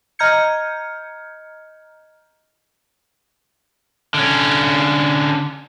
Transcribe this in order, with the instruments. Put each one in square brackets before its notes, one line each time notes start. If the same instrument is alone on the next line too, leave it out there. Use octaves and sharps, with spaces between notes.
[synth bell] D#5 A#5 F6 G6 G#6 C#7
[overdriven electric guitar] D3 C#4